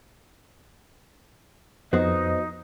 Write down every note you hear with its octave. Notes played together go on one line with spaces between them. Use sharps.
F2 B3 D#4 F#4 C5 D#5